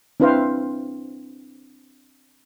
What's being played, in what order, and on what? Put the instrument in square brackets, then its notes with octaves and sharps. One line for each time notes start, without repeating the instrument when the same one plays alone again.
[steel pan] C4 D4 E4 B4 C5 F5